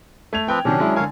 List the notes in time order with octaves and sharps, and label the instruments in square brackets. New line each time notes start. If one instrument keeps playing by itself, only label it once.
[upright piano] A3 G#6 F7
[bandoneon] F3 C4 B4 [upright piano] G5
[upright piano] C3 D#3 F#3 [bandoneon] C#4 D4
[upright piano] F#3 G#3 E4
[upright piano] D3 G#5 [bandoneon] A#4 C#5 F5